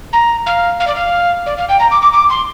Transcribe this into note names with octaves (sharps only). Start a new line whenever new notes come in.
A#5
F5
F5
D5
F5
D5
F5
G5
A#5
D6
D6
D6
C6